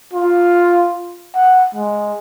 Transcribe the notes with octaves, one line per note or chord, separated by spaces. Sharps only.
F4
F#5
G#3